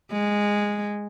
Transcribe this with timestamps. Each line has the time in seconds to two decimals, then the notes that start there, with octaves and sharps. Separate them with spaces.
0.12 G#3